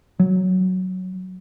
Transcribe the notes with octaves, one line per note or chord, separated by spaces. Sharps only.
F#3